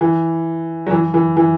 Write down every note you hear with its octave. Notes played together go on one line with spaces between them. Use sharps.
E3
F#3
E3
E3
E3